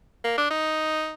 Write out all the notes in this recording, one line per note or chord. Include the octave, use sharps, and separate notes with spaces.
A#3
D4
D#4